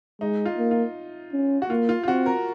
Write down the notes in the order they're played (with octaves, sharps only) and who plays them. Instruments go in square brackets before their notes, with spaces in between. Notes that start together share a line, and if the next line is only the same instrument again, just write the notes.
[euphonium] G#3 [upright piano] D#4
[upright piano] F4
[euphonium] A#3
[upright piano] F4
[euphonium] C#4
[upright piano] F#4
[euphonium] A#3 [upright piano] F4
[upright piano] F4
F4
[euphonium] C4 [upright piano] F#4
[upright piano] A#4